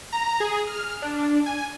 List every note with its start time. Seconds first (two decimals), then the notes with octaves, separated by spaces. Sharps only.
0.12 A#5
0.40 G#4
0.67 F6
1.02 D4
1.46 G#5